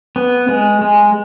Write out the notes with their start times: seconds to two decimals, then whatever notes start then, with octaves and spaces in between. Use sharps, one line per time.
0.16 B3
0.49 G#3
0.81 G#3